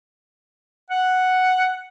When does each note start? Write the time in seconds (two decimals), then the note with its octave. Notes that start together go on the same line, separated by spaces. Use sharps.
0.90 F#5